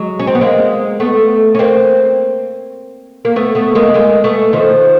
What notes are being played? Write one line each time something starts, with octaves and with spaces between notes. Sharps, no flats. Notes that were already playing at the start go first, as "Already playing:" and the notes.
Already playing: F#3 G#3
C#4
C4
B3
G#3 A#3
A3 B3
C#4
A#3 C4
A#3
A3 B3
A3 B3
G#3 A#3
G#3 A#3
A3 B3
D#3 F3